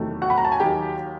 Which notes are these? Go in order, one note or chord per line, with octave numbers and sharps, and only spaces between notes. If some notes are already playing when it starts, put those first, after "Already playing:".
Already playing: E2 C3 D#3 F#3 A3
F#4 F#5
B5
A#5
A5
G#5
D#2 D#3 F#3 G4 G5